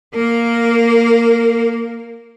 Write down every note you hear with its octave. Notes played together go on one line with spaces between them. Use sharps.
A#3 A#4